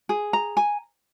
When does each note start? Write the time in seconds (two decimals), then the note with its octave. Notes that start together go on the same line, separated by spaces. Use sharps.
0.09 G#4
0.33 A#5
0.57 G#5